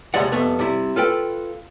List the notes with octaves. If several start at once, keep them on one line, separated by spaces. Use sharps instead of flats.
D#2 C3 G3 G#3 D5 F#5
C2 F2 A3 B3
C3 G3 E4
F4 A4 B4 G5